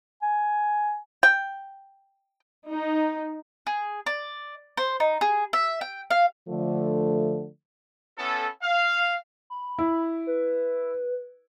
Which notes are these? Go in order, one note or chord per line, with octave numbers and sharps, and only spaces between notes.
G#5
G5
D#4
G#4
D5
C5
D#4
G#4
E5
G5
F5
D3 F3 A3
B3 C#4 E4 A4
F5
B5
E4
B4